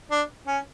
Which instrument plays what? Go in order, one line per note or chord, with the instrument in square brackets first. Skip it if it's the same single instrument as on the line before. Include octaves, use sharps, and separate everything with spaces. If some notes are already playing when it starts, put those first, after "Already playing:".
[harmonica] D4
C#4